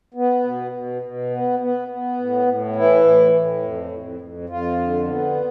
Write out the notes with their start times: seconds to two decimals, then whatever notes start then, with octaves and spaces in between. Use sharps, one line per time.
0.14 B3
0.43 B2
0.72 B2
1.02 B2
1.30 B3
1.59 B3
1.88 B3
2.17 A2
2.46 A2
2.76 E3 E4
3.04 A2
3.34 A2
3.62 F2
3.92 F2
4.21 F2
4.49 F2 F4
4.79 D3
5.08 B3